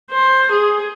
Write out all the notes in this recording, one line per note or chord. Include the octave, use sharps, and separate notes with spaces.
C5
G#4